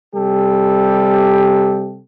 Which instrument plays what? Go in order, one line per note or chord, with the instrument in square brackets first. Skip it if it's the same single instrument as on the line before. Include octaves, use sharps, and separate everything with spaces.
[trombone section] C3 G3 G4 A4